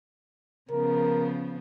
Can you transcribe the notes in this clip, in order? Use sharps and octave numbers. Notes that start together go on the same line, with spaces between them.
C#3 F3 B3 A#4